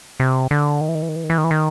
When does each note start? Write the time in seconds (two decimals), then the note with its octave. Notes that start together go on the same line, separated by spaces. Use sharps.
0.20 C3
0.51 D3
0.81 D#3
0.89 E3
0.95 D#3
1.02 E3
1.09 D#3
1.16 E3
1.24 D#3
1.30 E3
1.38 D#3
1.44 E3
1.51 D#3